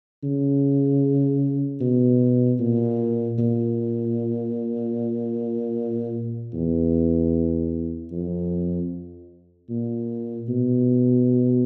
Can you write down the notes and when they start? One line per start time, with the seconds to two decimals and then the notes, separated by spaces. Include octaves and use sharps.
0.23 C#3
1.81 B2
2.59 A#2
3.39 A#2
6.54 E2
8.11 F2
9.69 A#2
10.48 B2